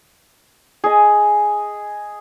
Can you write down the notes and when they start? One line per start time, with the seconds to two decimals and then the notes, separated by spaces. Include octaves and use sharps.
0.84 G#4 D#5